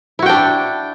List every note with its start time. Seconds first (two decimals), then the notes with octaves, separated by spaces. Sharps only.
0.19 E4
0.22 F#4
0.26 G5
0.29 D4